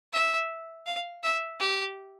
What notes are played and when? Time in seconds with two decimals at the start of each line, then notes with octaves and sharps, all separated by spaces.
0.13 E5
0.86 F5
1.23 E5
1.60 G4